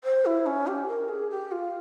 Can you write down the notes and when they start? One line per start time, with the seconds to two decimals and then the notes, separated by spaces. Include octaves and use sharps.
0.04 C5
0.26 E4
0.46 C#4
0.67 G4
0.88 A#4
1.09 G#4
1.30 G4
1.52 F4